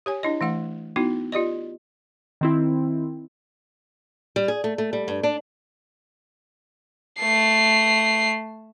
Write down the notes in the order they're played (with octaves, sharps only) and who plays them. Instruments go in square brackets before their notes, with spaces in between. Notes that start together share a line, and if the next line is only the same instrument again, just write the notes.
[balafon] G4 C#5 G#5
D4 E4 D#5
E3 A3 F#5
B3 D#4 E4 F#4
F4 G4 D5 D#5
[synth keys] D#3 C4 E4
[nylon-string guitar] G3
G#4
A3
A3
G3
G2
D4
[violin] A3 C7